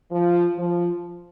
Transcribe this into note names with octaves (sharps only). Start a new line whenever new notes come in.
F3
F3